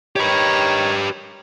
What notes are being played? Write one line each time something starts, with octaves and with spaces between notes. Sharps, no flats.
D#3 G4 B4 C#5